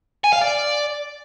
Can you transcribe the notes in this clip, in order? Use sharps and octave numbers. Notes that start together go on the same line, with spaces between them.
G#5
F5
D5